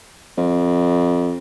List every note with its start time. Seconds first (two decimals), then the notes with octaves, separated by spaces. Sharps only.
0.38 F2